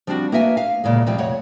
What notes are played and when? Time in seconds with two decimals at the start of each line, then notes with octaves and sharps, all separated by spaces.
0.07 F3 G3 C4 D4 F4 F#4
0.32 A#3 B3 F#4 E5 F#5 G#5
0.57 F5
0.84 D2 A#2 C#3 G#3
1.06 C3 F3 G3 G#3 C4
1.18 F2 C#5 F#5